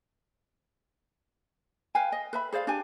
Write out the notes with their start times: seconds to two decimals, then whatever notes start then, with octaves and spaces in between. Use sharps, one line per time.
1.95 B4 F5 G5 G#5
2.12 D#5
2.33 B4 E5 B5
2.52 G#4 C5 D5 F5
2.67 D4 G4 G#5